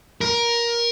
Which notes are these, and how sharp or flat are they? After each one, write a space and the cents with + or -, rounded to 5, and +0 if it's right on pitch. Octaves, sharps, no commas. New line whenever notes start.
A#4 +15